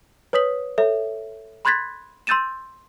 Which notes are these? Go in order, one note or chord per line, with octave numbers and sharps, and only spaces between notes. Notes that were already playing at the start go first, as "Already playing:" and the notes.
B4 C#5 D#6 B6 F#7
A4 C#5 E5
B5 C6 F#6 G#6 A6 B6
C6 E6 G6 A6 D#7 E7